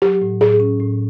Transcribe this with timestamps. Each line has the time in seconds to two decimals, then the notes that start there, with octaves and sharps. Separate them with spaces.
0.02 F#3 G4
0.22 A2
0.41 A2 G#4
0.60 C#4
0.80 A2